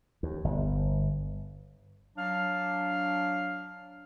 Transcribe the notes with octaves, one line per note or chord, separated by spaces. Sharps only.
D#2
G1
F#3 D4 F5 F6